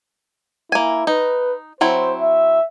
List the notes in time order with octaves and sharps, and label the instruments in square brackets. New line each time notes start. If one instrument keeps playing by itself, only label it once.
[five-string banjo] A#3 G#5 [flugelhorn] E4
[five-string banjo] D#4 [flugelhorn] B4
[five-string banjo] F#3 C4 E4 [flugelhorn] C5
[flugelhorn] E5